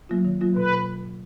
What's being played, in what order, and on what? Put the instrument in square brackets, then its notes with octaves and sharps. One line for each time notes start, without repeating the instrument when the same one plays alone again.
[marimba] F#3 A#3 F4
D#3
F#3 A#3 F4
[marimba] B2 [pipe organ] B4